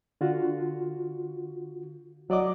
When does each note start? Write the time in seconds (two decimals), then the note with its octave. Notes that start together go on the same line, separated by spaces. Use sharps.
0.21 D3 F4 F#4
2.29 C2 F#3 D5 D#5 D6